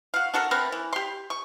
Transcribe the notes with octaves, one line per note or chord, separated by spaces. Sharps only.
F#4 F5
D4 F#4 A4 A#4
A3 C4 A#4 B4
E3
G4 C6
C#6